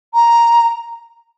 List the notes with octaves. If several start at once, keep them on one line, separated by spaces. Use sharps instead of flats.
A#5